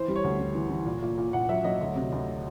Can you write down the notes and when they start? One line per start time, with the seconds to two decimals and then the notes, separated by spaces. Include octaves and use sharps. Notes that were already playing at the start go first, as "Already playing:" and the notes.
Already playing: E3 C5
0.08 G3
0.16 C#5
0.24 D2
0.40 G3
0.55 E3
0.70 E3
0.86 A#2
1.02 A#2
1.17 A#2
1.33 A#2 F#5
1.49 F#3 E5
1.64 F#3 D#5
1.81 D2
1.95 C3
2.12 D2